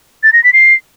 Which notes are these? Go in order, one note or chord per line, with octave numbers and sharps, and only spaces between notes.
A6
A#6
B6
C7